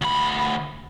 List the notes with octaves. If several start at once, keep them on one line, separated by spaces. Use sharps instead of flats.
D2 B5